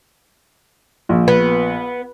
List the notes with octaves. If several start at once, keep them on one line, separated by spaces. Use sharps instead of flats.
A#1
B3